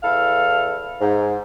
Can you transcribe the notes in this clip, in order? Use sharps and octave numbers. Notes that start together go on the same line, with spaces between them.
E2 E4 A4 F5
G#2